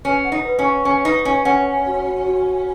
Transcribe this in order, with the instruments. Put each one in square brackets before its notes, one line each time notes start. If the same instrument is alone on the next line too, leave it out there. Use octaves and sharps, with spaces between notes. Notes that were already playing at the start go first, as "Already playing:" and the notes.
[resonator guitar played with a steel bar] C#4 [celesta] B4
[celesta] F#5
[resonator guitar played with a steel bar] D#4
[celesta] B4
[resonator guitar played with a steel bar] C#4
[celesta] C#6
[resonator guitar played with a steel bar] C#4 [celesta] C#6
[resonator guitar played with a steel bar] D#4 [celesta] B4
[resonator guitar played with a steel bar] C#4 [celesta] F#5
[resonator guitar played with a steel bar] C#4 [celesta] F#5
[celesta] G#5
F#4
F#4
F#4
F#4